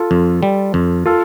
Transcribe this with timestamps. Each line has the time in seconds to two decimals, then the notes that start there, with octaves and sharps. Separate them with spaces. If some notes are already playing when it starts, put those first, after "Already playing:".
Already playing: F4 A4
0.11 F2
0.43 G3
0.74 F2
1.06 F4 A4